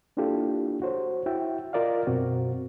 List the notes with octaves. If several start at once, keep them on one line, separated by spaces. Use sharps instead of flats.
A#3 D4 E4 F4 G4 A4
F#4 C5 C#5
E4 F#4 E5 G5
F4 A#4 D5 D#5 F5
F#2 B2 C4 F#4